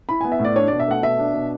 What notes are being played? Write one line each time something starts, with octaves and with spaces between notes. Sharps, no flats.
E4 B5
B3 G#5
E5
A2
D5
D4 C#5
B2 D5
E5
A3 F#5
B2 E5
D4
B2